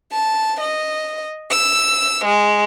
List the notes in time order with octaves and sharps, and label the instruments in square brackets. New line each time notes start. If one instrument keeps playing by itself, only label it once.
[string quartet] A5
D#5
E6
G#3